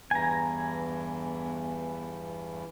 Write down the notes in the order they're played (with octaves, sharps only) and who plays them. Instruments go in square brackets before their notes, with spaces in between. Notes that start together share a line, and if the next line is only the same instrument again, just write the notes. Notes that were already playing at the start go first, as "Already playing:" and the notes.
[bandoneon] E2 G2 E3 [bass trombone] B3 [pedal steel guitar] G#5 A#5